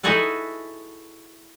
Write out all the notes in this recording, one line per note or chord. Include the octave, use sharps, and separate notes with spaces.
D#4 E4 F#4 G#4 A4 B4